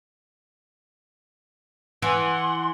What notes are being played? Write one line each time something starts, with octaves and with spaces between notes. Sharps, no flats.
E3 F#5 G#5 C6